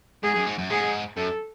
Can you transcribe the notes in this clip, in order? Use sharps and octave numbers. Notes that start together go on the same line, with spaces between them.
G#2 G#4
F#2
G#2
F#2
G#2 G#4
F#2 A4